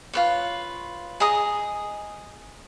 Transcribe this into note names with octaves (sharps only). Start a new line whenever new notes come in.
F4 B4 C#5
G#4 D#5 A#5 D#6